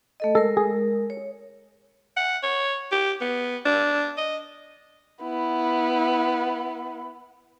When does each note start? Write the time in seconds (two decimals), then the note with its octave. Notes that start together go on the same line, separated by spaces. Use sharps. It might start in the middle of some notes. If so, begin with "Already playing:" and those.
0.20 A3 A4 D#5
0.35 G#3 A4 A#4
0.57 G#4
1.10 C#5
2.17 F#5
2.43 C#5
2.92 G4
3.21 B3
3.66 D4
4.18 D#5
5.23 B3 E4